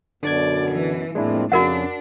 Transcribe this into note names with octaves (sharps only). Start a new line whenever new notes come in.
F#2 B2 D3 D4 D5 G#6
E3
F2 A2 G#3 A#3 C4 D4 E4
F2 C#3 D4 F#4 A#4 F#5